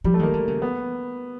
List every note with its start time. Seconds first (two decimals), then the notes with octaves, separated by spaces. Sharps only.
0.04 F3 G3
0.14 A3
0.19 D#3 A#3
0.34 D3
0.48 C#3
0.62 B3